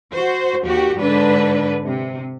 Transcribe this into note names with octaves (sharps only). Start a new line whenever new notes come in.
F#4 C5
D#2 F#4 G4
G#2 D3 D4 B4
C3